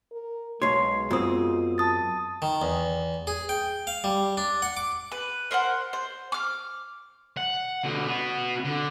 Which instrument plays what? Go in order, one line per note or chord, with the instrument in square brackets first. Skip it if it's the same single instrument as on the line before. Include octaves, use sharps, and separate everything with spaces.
[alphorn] A#4
[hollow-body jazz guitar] B1 C#5 [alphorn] G#3 [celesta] C6 C7
[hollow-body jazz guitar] F#2 C4 [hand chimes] B3 D#6 [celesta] F4
[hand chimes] A5 D#6 A6
[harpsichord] D#3
E2
G#4
G5
F5
G3
D4
F#5
D6
[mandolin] B4
A#4 C5 F5 F#5
C5
D6 F6
[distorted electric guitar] F#5
B2 D3
B3 F#4
D3